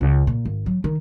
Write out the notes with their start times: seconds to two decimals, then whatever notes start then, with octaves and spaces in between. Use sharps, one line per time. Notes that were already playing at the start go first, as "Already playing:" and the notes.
0.01 C#2
0.27 A#2
0.45 G#1
0.66 F#3
0.84 D#3